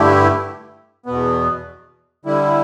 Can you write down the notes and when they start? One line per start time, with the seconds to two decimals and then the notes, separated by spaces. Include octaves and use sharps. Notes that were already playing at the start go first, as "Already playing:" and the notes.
Already playing: G2 D3 A3 E4 G4
1.06 E2 B2 B3
2.25 D3 G3 E4